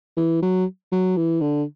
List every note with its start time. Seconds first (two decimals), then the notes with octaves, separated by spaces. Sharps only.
0.17 E3
0.43 F#3
0.92 F#3
1.17 E3
1.41 D3